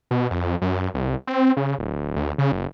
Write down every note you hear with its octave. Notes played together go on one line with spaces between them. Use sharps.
B2
F2
F#2
C2
C4
C#3
D1
D2
C#3
F#1